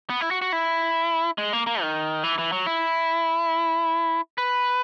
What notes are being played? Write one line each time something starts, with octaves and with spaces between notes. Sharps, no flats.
B3
E4
F#4
F#4
E4
G#3
A#3
A#3
D#3
E3
E3
F#3
E4
B4